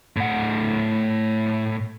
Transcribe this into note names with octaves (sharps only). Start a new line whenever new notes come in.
A2 F#5